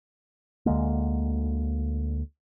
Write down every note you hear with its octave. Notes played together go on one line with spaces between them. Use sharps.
D2 D3 G#3 A#3